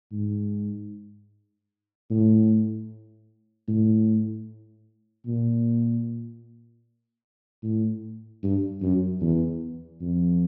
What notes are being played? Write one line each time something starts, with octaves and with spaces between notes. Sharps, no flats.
G#2
A2
A2
A#2
A2
G2
F#2
E2
F2